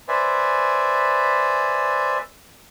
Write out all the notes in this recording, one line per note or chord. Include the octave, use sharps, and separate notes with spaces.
B4 C5 D5 E5 G#5